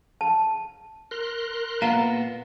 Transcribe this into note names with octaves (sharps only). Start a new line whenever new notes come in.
A5
A#4 C6 F#6
A#2 B3 F5 A#5